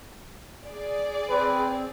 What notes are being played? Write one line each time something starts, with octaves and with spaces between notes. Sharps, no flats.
G#4 D5
C4 B4